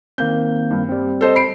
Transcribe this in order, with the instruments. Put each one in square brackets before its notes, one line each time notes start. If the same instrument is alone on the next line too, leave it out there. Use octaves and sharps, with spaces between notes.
[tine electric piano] D#3 A#3 C4 [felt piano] G6
[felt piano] G2
[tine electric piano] G3 C4
[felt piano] A4 C5 D#5
B5 C7 D7